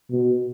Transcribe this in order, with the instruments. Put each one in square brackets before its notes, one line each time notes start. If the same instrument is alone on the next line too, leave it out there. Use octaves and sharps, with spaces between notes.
[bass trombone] B2